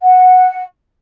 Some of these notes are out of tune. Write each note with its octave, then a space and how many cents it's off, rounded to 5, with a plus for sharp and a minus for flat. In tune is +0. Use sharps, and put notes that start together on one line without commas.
F#5 -10